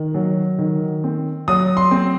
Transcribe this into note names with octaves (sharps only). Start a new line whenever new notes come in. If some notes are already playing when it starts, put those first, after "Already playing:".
Already playing: D#3
F#3
D#3
C4
F#3 D#6
C6
C4